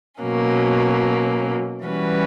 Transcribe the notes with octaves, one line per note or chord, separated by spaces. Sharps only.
B2 F#3 A#3 C#4
E3 G3 C#4 F#4 B4